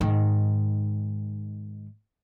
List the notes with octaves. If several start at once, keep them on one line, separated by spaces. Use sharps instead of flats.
G#2 D#3